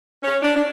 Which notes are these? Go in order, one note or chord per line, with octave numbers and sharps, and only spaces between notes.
C#4
D4
D4